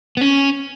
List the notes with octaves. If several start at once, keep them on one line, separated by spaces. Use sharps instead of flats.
B3
C#4